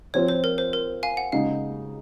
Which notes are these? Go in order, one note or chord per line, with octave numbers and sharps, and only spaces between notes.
F3 C4 F4 C#5
C5
A#4
C5
A#4
F5 G#5
F#5
C#3 G#3 D#4 F5